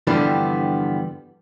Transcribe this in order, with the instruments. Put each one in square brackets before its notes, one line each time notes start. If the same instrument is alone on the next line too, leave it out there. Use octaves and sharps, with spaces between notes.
[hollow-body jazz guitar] G2 D3 E3 F3 G3 B3